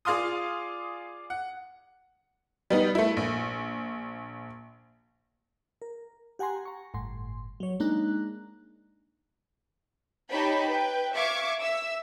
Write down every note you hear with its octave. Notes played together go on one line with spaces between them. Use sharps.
F4 G#4 D5 F5 C6 D#6
F#5
G3 B3 D#4
A3 E4
A#1
A#4
G4 F#5 G#5 A#5 C6
A#5 C#6
G1 A2 C6
F#3 C#5
G#3 A#3 D4 D#4 A#5 F#6
D#4 G4 C#5 G5 A5 B5
B4 G5
E5 F5 C#6 D6 G#6
E5 E6